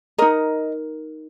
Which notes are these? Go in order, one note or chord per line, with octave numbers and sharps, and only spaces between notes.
D#4 A#4 D#5